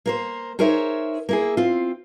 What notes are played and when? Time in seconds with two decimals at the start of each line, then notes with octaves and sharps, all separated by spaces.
0.06 A#3 A#4 C5
0.59 D#4 G#4 A#4 C5 C#5 E5
1.29 A#3 E4 G#4
1.57 C4 F4